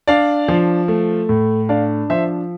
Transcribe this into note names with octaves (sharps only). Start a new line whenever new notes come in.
D4 D5 F5
F3
A3
A2
D4 D5 F5
F3 C5 E5